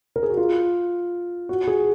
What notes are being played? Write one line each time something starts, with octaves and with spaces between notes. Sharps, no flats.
A#4
G#4
F#4
F4
F#4
G#4